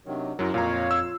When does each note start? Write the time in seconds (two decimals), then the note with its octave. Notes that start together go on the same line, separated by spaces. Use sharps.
0.06 C3 D#3 F#3 D4
0.39 F#2 F#3 E4 A#4
0.54 F2 A#2 F4 C#5 F5 A#5
0.91 E6